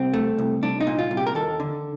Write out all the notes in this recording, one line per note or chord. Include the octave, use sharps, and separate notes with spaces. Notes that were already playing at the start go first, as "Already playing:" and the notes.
Already playing: C2 C4
A3
C2
C2 D4
D#4
A#2
F4
C2
G4
A#4
D#2 A4
D3